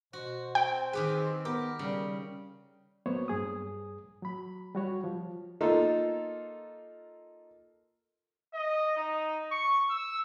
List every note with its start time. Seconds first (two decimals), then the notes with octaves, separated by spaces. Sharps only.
0.13 B2 F#4 C5
0.55 C4 G5
0.93 D#3 G4 G#4 B4
1.45 B3 G4 A#4
1.79 C#3 G3
3.06 F#3 A#3 B3 C5 C#5
3.28 G2 G#4 D#6
4.22 F#3 B5
4.75 G3 F#4 C#5
5.04 F3
5.61 A#3 D#4 F4 A4
8.54 D#5
8.96 D#4
9.52 C#6
9.90 E6